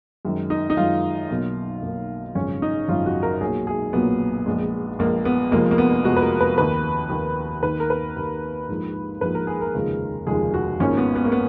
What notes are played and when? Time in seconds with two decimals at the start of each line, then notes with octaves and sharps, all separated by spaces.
0.25 F#2 D#3 G#3
0.50 D#4
0.70 D#4
0.77 F#2 D#3 G#3 F4
1.30 B1 B2 A#3
1.82 B1 B2 A#3
2.35 G#1 F#2 C#3 F3 C#4
2.62 D#4
2.88 G#1 F#2 C#3 F3 F4
3.06 F#4
3.23 A#4
3.41 B1 A#2 F#3 A#3 G#4
3.67 G#4
3.93 B1 A#2 F#3 A#3 B3
4.46 A#1 A#2 G#3
4.99 A#1 A#2 G#3 A#3
5.25 B3
5.52 F1 F2 F3 G#3 A#3
5.71 A#3
5.78 B3
6.04 F1 F2 F3 G#3 F#4
6.16 B4
6.22 A#4
6.41 B4
6.58 D#2 D#3 A#3 B4
7.10 D#2 D#3 A#3
7.62 D#2 D#3 A#3 B4
7.80 A#4
7.90 B4
8.16 D#2 D#3 A#3
8.68 A#1 G#2 F3 A#3
9.21 A#1 G#2 F3 A#3 B4
9.35 A#4
9.47 G#4
9.61 A#4
9.74 F1 D#2 C#3 F3 G#3
10.27 F1 D#2 C#3 F3 G#3 G#4
10.54 F#4
10.80 G#1 G#2 F3 A#3 C#4
10.97 B3
11.15 B3
11.25 A#3
11.32 B3